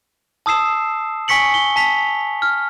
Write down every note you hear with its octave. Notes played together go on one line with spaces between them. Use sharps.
A5 D#6 E6 C7 E7
G#5 C#6 B6 C#7 F#7
G7
A5 B6 F7
F6